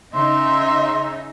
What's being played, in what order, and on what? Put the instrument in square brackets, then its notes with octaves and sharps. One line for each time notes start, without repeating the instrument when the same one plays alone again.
[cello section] C#3 D#4 [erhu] E5 [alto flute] C6